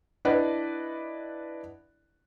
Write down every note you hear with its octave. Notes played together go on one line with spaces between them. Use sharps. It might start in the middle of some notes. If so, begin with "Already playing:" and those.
D4 E4 B4 D5 D#5 F#5